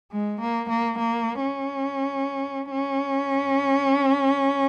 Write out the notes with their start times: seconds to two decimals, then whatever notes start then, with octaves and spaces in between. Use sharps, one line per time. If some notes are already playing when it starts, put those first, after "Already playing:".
0.12 G#3
0.41 A#3
0.70 A#3
0.98 A#3
1.42 C#4
2.71 C#4